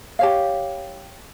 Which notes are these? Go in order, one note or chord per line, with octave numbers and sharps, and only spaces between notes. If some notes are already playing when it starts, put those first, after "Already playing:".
G4 C#5 F5